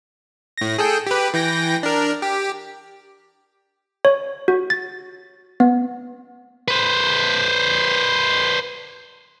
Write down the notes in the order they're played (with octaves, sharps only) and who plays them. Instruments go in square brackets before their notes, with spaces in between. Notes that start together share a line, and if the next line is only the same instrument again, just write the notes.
[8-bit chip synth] A2 A#6
G#4 A4 G5
G4 B4
E3 G5 A#6
D4 A#4
G4
[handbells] C#5
F#4
A6
B3
[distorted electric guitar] B4 C5